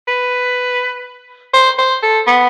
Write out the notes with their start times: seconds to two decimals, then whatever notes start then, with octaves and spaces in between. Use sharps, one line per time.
0.08 B4
1.54 C5
1.78 C5
2.03 A4
2.27 B3